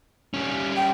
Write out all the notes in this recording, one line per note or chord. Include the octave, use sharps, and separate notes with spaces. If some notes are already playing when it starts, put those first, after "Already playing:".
G3 C#4
G5